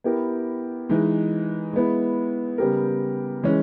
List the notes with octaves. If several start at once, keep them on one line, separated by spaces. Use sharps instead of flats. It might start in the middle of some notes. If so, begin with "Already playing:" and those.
B3 E4 G4 A#4
E3 G#3 D#4
G#3 B3 E4
C#3 G3 B3 G4 A#4
E3 G#3 C#4